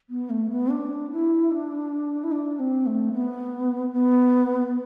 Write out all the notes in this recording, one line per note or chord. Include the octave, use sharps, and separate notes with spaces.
B3
A3
B3
D4
E4
D4
E4
D4
C4
A3
B3
B3